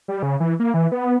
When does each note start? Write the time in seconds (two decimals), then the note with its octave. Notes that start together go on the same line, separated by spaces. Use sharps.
0.08 G3
0.23 C#3
0.40 E3
0.60 A#3
0.74 E3
0.92 B3